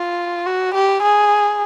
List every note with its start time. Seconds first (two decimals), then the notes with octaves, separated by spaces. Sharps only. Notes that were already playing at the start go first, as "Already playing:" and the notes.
Already playing: F4
0.46 F#4
0.75 G4
1.03 G#4